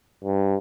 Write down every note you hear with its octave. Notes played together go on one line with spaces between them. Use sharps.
G2